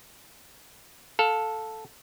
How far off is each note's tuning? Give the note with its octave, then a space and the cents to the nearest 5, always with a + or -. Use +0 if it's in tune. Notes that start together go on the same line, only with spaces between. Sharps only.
A4 +0 F5 +20